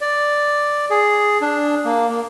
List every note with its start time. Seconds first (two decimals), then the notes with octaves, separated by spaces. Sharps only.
0.01 D5
0.90 G#4
1.42 D4
1.85 A#3
2.09 A#3